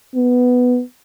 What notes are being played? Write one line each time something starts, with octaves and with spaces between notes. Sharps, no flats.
B3